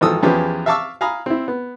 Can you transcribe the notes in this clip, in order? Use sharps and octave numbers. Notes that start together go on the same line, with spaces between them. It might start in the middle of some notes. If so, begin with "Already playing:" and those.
G#1 E3 F3 A4 D#6 E6
E2 F3 C#4 G4 G#4 B4
E5 F5 A5 C#6 D6 E6
F5 G#5 A#5 B5 D#6
C4 E4
B3